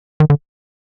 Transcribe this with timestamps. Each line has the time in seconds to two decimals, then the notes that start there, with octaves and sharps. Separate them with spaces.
0.20 D#3
0.30 D3